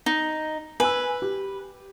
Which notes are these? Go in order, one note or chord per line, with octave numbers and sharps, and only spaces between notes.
D#4
B4 G#5 E6
G4